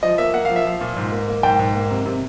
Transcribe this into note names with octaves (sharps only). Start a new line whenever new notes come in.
F3 D#5
A#3 E5
A#3 F#5
F3 F5
E5
F3 F5
A#2
G#2
A#3
A#3
G#2 G5
G#2
A#3
C3
C3